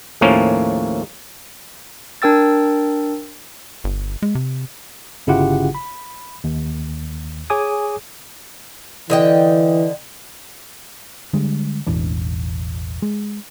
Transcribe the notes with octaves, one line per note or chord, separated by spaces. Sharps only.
D#2 A2 F3 A#3 C#4
D4 A#4 G5 E6 A6
G1
G#3
C3
G1 C#3 E4 F4 G4 F#5
B5
D#2
G#4 C#5 G#5 D6 D#6
D3 E3 D#5 G5
D3 G3 G#3
E1 A1 E3 D4
G#3